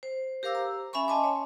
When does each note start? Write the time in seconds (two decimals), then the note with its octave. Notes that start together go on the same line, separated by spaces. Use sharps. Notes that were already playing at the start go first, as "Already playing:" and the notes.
0.03 C5
0.43 G4 A#4 C5 F5 D6 E6
0.55 A#5
0.93 C#4 E5 G#5 B5 C#6
1.08 D#5 G#5 A5 C6 D6
1.24 C#5